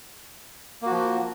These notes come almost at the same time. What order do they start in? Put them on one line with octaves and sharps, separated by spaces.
A#3 F#4 F3